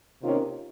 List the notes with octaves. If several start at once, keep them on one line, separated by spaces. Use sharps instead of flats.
C3 D#3 A#3 C#4 F4